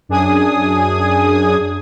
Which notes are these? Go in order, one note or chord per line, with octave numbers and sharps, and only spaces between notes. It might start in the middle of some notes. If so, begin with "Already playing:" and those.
F#2 D4 G#4 G#5 D#6